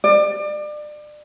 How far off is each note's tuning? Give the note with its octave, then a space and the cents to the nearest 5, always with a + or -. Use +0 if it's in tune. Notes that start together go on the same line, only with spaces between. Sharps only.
D5 +30